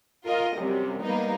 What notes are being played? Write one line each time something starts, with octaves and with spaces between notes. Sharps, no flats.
F4 A#4 D#5
F#2 C3 G3
G3 A#3 B3 D#4